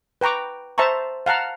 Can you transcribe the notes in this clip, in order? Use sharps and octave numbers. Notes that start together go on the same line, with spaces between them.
B4 G5 A#5 C#6 D6
C5 E5 A5 A#5 C#6
F5 F#5 A5 A#5